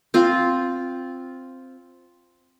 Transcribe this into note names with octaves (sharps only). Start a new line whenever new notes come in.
C4 F4